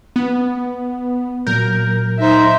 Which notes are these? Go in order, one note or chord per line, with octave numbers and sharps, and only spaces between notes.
B3
A#2 F#3 A#4 G6
D#4 C5 E5